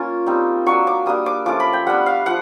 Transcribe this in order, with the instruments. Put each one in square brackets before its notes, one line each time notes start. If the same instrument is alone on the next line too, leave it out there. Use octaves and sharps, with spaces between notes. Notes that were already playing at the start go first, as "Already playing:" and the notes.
Already playing: [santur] A#3 C#4 F4
G3 C4 D#4
F#3 A#3 D4 C#6
D6
G3 A#3 D4 D#6
D6
F3 A3 C#4 F4 D6
B5
G5
G3 B3 D4 F#5
F5
F3 F#5